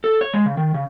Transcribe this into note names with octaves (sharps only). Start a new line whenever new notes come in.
A4
C#5
G#3
C#3
D#3
C#3